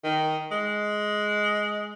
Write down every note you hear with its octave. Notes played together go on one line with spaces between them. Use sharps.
D#3
G#3